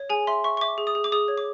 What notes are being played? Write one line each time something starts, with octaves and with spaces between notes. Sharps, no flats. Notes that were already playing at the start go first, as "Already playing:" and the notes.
Already playing: C#5
G#4 G#5
E5 C6
E5 C#6
C#6
E5 D6
G#4
D#6
G#4
D6
G#4 D#6
C#5
D6